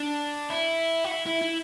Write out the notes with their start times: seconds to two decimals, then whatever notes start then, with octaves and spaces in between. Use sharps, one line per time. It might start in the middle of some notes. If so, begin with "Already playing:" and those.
Already playing: D4
0.50 E4
1.04 F#4
1.11 E4
1.27 E4
1.42 E4